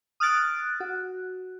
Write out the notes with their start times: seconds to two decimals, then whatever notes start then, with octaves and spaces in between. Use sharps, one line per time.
0.20 D#6 F6 F#6 A6 D7
0.80 F#4